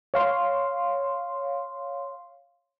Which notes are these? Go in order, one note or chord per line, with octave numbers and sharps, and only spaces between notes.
C#5 F5 C6